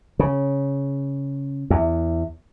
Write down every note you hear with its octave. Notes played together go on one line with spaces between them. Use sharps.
C#3
E2